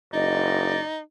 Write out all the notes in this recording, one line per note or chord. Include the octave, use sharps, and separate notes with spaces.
F#1 D#4 D5 D#5